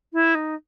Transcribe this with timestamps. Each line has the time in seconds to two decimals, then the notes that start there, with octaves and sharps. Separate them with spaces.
0.13 E4
0.35 D#4